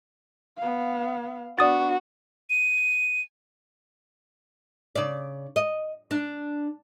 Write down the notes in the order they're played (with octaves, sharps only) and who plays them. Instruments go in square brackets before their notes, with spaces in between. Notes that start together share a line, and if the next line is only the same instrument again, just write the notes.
[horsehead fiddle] B3 F5
[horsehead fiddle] B3 D4 [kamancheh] F#4 [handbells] D5 D#6 A6
[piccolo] D#7
[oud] C#3 D5
D#5
D4